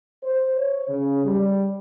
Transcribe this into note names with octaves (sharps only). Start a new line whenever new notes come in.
C5
C#5
C#3
G3